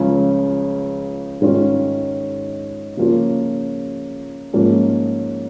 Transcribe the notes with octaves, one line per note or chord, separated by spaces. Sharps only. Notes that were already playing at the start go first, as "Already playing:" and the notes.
Already playing: C#2 C#3 F3 C#4
G#2 D#3 C#4 F4
C#3 F3 A#3 C#4 F4
G#2 F3 A#3 C#4